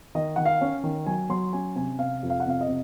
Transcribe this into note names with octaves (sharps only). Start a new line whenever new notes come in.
D#3 D#5
D#3 F#5
F5
C#4
D#3
F#3 G#5
F#3 C6
C#4 G#5
C3 G#5
C3 F5
F2
F5
F#5
C3 F5
D#5
C3